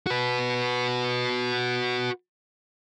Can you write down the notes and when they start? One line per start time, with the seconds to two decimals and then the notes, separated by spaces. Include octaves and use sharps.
0.07 F#4 B4